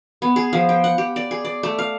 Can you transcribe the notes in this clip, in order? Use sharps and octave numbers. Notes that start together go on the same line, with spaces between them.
B3
G#4
F3
G5
F#5
G4
D5
G#4
D5
A3
F5